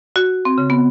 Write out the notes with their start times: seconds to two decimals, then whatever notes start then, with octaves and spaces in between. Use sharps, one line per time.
0.16 F#4
0.45 C4
0.58 C#3
0.70 B3